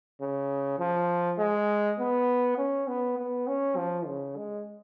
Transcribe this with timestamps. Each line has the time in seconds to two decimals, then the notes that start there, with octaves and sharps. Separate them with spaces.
0.21 C#3
0.79 F3
1.39 G#3
2.00 B3
2.58 C#4
2.88 B3
3.19 B3
3.47 C#4
3.77 F3
4.07 C#3
4.37 G#3